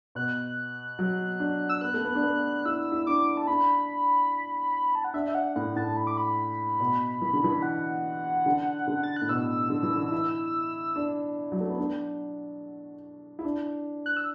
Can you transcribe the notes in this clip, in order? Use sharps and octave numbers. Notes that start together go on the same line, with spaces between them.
B2 F#6
F#3
D4
E6
B3 F#6
A3
B3
D4
B3
E4 E6
E4
D4 D6
A5
D4 B5
A5
F#5
D4 E5
E5
F#5
A2 F#5
A2 A5
B5
D6
B5
B2
E3
D3
E3
F#5
D3
D3
A6
F#6
A2
B2 E6
D3
E3
D3
E4
D4
F#3
A3
B3
D4
E4
D4
F#6
E6